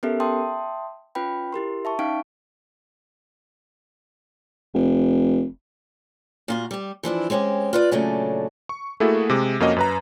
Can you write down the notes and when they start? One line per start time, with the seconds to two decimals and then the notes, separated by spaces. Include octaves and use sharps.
0.03 B3 C#4 G4 A4 A#4 E5
0.20 E5 G5 A5 C6 D#6
1.15 C#4 F4 B4 G5 B5
1.53 E4 G4 A#4 C6
1.85 E5 A5 C#6
1.99 C#4 D#4 F5 G5 C#6 D7
4.74 F1
6.48 A#2 F4 F#4
6.71 G3 G4
7.03 E3 F3 D4 E4
7.30 G#3 C4 C#4 F#4 G4
7.73 F4 B4 D5
7.91 A#2 C#3 F#3 A3 D4 G#5
8.69 C#6
9.00 A3 A#3 E4 F#4 G#4 A4
9.30 C3 G#3 D6
9.60 F2 A#3 C#4 F#4 D#5
9.76 F#2 B4 A#5